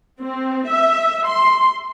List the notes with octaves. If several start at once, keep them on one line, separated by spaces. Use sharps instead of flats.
C4
E5
C6